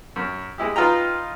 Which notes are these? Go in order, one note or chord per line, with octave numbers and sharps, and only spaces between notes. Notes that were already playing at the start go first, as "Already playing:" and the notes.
F#2
G#3 E4 G4
D#4 F4 B4 D#5 G5 A#5